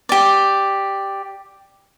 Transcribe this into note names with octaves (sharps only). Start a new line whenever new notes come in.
G4 D5